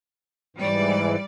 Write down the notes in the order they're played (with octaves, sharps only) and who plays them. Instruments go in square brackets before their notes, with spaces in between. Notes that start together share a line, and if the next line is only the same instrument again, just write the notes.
[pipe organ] G#2 E3 [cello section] G3 D5